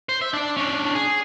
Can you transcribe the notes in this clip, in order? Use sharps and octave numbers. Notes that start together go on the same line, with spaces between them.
C5
E5
D4 D5
C#4 D4
G#4